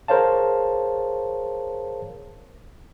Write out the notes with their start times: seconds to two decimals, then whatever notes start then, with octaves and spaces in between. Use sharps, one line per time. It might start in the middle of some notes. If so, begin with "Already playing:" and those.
0.08 G#4 A#4 C5 C#5 F5 A5